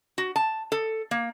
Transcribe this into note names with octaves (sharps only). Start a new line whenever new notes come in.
F#4
A5
A4
A#3